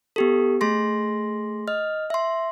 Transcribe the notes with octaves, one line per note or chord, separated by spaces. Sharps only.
B3 G4 A4
A3 G#4 C6 A#6
D#5 F6
E5 C6